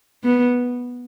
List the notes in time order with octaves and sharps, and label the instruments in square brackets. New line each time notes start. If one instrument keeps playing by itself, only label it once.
[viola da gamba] B3